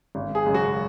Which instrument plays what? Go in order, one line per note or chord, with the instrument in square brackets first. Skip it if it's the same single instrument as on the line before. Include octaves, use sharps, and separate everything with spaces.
[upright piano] G#1
[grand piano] G#4
[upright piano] F#2 C#3 G#3
[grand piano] F#4